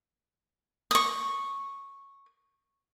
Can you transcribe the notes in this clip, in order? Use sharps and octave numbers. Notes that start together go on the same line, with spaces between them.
C#6 D#6